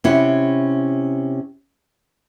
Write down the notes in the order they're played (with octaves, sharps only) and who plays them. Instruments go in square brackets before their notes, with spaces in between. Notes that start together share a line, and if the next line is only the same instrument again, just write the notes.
[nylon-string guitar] C3 C#4 E4 F#5